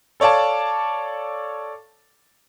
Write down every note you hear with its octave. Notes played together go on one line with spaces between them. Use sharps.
A4 C#5 D5 F5 A5